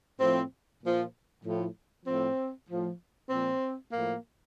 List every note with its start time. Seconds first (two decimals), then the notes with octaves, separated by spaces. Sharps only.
0.20 A2 F3 C4
0.82 A#2 F3
1.44 A2 F3
2.06 A2 F3 C4
2.68 A2 F3
3.30 A#2 F3 C4
3.92 A2 F3 A#3